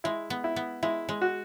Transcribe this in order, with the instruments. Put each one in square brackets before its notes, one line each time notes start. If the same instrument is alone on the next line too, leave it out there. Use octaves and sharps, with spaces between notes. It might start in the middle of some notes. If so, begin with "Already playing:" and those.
[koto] G#3 [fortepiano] E4
[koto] B3
[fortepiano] E4
[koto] B3
[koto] G#3 [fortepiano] E4
[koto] G#3
[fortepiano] F#4